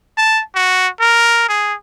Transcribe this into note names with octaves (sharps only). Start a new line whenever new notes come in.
A5
F#4
A#4
G#4